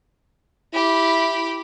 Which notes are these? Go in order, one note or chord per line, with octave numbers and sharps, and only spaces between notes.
E4 G4 B5